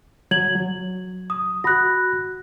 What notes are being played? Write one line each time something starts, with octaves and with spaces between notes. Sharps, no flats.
F#3 G#6 F#7
F#3
D#6
F#4 B5 F#6 A#6